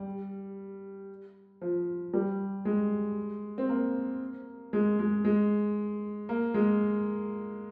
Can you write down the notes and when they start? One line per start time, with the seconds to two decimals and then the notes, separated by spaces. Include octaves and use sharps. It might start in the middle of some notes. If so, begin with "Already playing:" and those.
Already playing: G3
1.61 F3
2.14 G3
2.65 G#3
3.58 C4
3.69 A#3
4.73 G#3
4.99 G#3
5.25 G#3
6.29 A#3
6.54 G#3